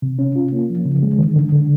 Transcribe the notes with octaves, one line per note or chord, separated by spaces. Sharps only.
C3
C#4
F4
A#3
F3
C#3
G#3
D#3
D3
D3